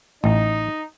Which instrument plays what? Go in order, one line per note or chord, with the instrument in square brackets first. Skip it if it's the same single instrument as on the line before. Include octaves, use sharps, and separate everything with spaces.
[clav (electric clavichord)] A1 [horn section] D#4